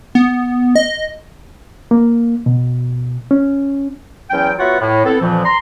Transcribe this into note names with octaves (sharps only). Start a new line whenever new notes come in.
B3
D#5
A#3
B2
C#4
E2 F#3 C#4 G5
B3 F4 F#4 C#5 E5 F#5
A2
B3 C4 E4 A4
F2 A#2 E3 F3
A#5 C6